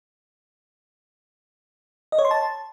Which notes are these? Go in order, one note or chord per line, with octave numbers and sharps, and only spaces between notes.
D#5
C#5
C6
A5